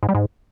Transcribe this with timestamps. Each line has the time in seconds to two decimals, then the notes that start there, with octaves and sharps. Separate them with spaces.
0.03 G#2
0.09 G3
0.15 G#2